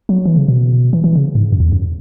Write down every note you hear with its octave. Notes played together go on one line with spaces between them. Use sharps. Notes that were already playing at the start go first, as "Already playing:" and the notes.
F#3
E3
C#3
B2
E3
E3
C#3
G#2
F#2
E2
F#2